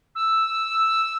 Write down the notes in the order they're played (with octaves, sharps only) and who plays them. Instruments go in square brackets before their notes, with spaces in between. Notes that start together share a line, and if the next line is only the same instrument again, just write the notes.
[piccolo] E6